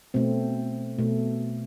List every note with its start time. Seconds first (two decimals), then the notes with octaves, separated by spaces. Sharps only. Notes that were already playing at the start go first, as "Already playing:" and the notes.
0.14 B2 A3 C4
0.98 B2 A3